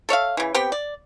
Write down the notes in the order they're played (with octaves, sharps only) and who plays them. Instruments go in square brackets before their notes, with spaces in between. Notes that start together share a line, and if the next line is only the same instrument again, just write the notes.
[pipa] A4 C#5 E5 F5
C#3 E3
B3 C4 G4 G5
D5